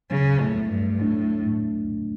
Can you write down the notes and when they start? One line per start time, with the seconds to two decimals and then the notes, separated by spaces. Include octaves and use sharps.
0.10 C#3 F#3
0.41 A2
0.56 A3
0.70 G2
1.01 A2 D4
1.46 A2